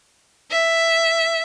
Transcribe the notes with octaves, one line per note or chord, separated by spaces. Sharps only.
E5